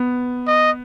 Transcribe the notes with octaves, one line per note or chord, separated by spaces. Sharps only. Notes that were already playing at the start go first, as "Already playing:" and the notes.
Already playing: B3
D#5